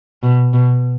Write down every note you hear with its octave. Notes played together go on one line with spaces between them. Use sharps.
B2
B2